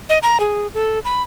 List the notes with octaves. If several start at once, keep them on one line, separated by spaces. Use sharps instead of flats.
D#5
A#5
G#4
A4
B5